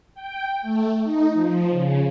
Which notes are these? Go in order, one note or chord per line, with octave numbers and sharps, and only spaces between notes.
G5
A3
D#4
F3
C#3